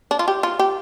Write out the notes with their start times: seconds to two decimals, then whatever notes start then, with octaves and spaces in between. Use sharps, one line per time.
0.11 D4
0.19 F4
0.28 G4
0.43 F4
0.59 G4